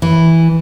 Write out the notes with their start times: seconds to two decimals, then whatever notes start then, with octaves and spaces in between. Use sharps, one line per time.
0.02 E3